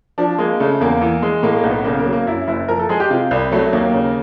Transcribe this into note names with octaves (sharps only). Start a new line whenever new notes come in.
F3 D4
G#3 A#3
C#3 A3
E2 A#3
E3
G#3
A2 A#3
A#3
B1
B3
C#3 A#3
A#3
F#3
A#3
F#2 E4
F#1 E4
F3 A#4
A4
G#3 G#4
G4
C3 F4
C2
F#3 A3
D#2 A#3
C#3